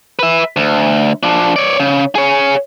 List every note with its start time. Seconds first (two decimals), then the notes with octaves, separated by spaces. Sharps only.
0.19 B4 E5
0.56 D2
1.23 F3 D4
1.56 C#5 D5
1.80 C#3
2.15 G#4 C#5